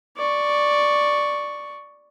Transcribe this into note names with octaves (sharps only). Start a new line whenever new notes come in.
D5 C#6